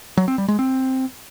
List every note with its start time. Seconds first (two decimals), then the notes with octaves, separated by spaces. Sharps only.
0.17 F#3
0.28 C4
0.38 G3
0.48 G#3
0.59 C4